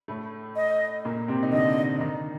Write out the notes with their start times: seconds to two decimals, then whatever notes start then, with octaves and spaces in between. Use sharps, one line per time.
0.08 A2 A3
0.56 D#5
1.05 A#2 A#3
1.28 C3 C4
1.43 D#4
1.52 D3 D4 D#5
2.00 D#3 D#4